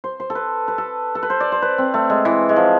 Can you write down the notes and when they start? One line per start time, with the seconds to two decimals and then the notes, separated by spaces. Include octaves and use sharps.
0.04 C5
0.20 C5
0.30 A4
0.35 B4
0.68 B4
0.78 A4
1.15 A4
1.23 B4
1.30 C5
1.40 D5
1.52 C5
1.62 B4
1.78 C4
1.94 A3
2.10 G#3
2.25 E3
2.49 G#3
2.56 F3